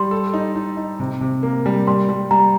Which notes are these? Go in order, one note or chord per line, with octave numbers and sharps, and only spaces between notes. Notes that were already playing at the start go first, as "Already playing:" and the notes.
Already playing: G3 C6
A4
D#4
D#4
D#4
C3
C3
A#3
G3
G3 C6
G3
G3 A#5